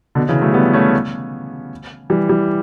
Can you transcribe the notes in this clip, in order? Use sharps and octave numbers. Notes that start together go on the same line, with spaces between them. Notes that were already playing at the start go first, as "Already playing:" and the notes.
B2 D3
C#3 E3
F#3 A3
G3 B3
A3 C#4
E3 G3
E3 G3